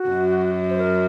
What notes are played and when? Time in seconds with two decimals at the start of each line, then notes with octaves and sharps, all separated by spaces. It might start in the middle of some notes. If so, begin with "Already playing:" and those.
Already playing: F#4
0.09 F#2
0.70 C5
0.78 A#4